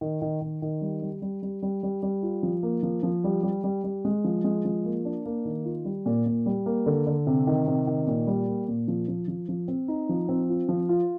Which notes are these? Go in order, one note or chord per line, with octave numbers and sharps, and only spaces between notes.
D#3
D#3
D#3
D#3
G3
G3
G3
G3
G3
G3
G3
F4
F3
A#3
F3
F3
G3
G3
G3
G3
G#3
F3
G#3
F3
A#3
D4
A#3
D#3
F4
G3
A#2
A#2
G3
A#3
D3
D3
C3
D#3
C3
D#3
A#2
G3
A#3
A#2
F3
F3
F3
F3
C4
D#4
F3
C4
F4
F3
F4